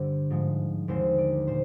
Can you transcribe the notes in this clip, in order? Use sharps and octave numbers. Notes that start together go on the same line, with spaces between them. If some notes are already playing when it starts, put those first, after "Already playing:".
Already playing: G2 D3 G3 C4 D5
G#2 F3 G#3
D#2 D3 G#3 C4 C5
D5
A#2 C5